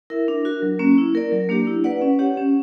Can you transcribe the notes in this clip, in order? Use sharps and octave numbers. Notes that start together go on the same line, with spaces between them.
E4 A#4 E5
D4
F#4 A#4
F#3
A#3 C#4
E4
A#4 D5
F#3
A#3 D4 G4
E4
B4 D5 F#5
C#4
G4 C#5 F#5
C#4